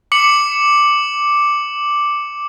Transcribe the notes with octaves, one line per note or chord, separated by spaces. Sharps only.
D6 C#7 F#7